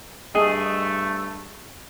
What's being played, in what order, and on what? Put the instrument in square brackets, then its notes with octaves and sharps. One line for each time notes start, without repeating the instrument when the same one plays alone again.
[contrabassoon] G2 [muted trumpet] A3 [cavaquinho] G#4 [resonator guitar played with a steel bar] D#5